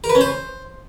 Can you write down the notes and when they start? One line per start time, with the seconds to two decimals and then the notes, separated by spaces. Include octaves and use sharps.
0.04 A#4
0.09 B4
0.15 C#4
0.21 C5